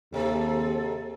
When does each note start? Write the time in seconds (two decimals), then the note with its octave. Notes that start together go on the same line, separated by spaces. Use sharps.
0.13 D#2 G#2 C3 A4